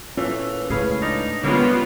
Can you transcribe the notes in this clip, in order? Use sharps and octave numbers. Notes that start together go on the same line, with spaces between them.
A#2 E3 A3 C#4
C#2 A2 C#4 G#4 B4 F5
D4 D#4
D3 G3 G#3 A#3 B3 C#4 F4 C#5